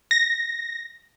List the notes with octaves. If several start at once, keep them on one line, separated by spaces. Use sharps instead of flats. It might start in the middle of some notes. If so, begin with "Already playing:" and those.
A#6